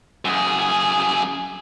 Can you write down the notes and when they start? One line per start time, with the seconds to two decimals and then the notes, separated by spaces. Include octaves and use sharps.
0.25 F#2 G#4